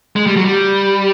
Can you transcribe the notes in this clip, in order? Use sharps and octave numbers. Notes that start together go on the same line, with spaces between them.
G#3
G3
F#3
G3